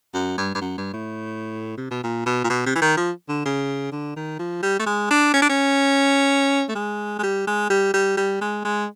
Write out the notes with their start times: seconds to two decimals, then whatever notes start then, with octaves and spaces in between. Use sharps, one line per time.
0.14 F#2
0.37 G2
0.55 G2
0.61 F#2
0.78 G2
0.93 A2
1.78 C3
1.91 B2
2.04 A#2
2.26 B2
2.44 A#2
2.50 B2
2.66 C3
2.75 E3
2.82 D#3
2.97 F3
3.29 D3
3.46 C#3
3.92 D3
4.16 D#3
4.39 F3
4.63 G3
4.79 A3
4.86 G#3
5.11 D4
5.34 C#4
5.42 D4
5.49 C#4
6.69 A3
6.75 G#3
7.19 G#3
7.23 G3
7.47 G#3
7.70 G3
7.94 G3
8.17 G3
8.41 G#3
8.65 G#3